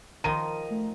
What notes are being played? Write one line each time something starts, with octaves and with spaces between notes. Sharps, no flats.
D#3 F3 D#4 A#5 D#7
A3